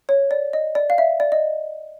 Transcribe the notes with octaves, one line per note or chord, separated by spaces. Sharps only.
C#5
D5
D#5
D5
F5
E5
D5
D#5